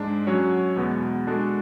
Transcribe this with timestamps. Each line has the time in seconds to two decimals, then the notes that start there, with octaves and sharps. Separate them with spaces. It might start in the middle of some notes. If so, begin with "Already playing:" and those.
Already playing: G#2 G#3 D4
0.27 F#3 C#4 F#4 C#5
0.76 E2 B2 G#3 B3
1.27 G#3 D4 F#4 A4